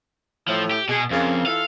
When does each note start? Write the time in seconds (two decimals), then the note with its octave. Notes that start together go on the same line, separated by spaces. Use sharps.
0.48 A2 F3
0.71 G4
0.89 B2 G#4
1.11 F2 C#3 A#3 C4
1.46 E3 F4 A4 F5